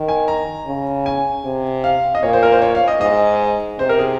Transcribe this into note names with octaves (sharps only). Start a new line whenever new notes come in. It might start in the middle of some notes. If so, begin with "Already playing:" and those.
Already playing: D#3
G#5
A#5
C#3
G#5
C3
F5
D#5
A#2 C#5
C5
A#4
C5
C#5
F5
D#5
G#2 D#5
C3 C5
A#4
G#4